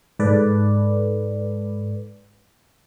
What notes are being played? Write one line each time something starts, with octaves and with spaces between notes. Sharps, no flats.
G#2 A4 B4 D5